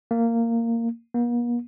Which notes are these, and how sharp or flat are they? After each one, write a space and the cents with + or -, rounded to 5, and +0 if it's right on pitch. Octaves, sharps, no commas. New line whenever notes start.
A#3 -15
A#3 +45